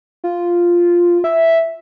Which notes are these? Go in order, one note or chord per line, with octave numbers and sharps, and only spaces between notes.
F4
E5